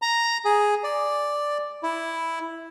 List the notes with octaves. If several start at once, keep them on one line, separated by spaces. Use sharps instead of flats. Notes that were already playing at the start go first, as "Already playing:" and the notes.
A#5
G#4
D5
E4